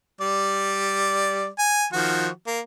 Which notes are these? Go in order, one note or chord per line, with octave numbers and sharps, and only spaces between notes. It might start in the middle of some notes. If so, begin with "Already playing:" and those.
G3 D5
G#5
D#3 F3 F#4
A#3